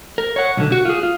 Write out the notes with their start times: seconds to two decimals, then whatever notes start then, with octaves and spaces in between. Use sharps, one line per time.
0.18 A#4
0.36 C#5 F#5
0.57 B1 D3
0.72 F#4
0.85 F4 G#4
1.03 F4